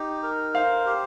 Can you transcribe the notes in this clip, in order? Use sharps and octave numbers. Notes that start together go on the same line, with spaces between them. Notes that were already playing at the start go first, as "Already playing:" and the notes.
Already playing: D#4 G4
A#4
C5 F5
G4